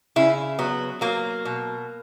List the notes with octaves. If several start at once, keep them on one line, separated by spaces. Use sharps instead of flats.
C#3 E4
F#3 B3
F#3 A#3
B2